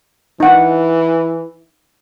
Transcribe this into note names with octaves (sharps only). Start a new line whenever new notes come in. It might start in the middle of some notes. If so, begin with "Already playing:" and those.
E3 D#4 F#5